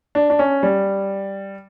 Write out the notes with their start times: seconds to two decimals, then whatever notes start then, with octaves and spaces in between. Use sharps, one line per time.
0.15 D4
0.30 D4
0.39 C#4
0.63 G3